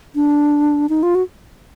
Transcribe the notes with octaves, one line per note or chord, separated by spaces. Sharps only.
D4
D#4
F4
F#4